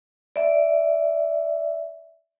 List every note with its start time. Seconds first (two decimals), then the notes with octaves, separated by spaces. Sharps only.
0.36 D5 E5